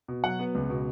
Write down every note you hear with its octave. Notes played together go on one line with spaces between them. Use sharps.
B2
F#3 F#5
B3
C#2
B2